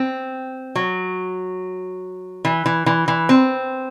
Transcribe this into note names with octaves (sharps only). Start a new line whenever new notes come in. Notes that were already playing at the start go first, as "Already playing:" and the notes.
Already playing: C4
F#3
E3
E3
E3
E3
C4